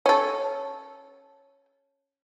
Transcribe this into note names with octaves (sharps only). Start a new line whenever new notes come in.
C#4 A4